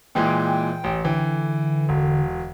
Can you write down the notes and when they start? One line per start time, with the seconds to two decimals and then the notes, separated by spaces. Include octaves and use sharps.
0.15 A#2 E3 G#3 G5
0.84 A1
1.05 D3 E3 G5
1.89 E1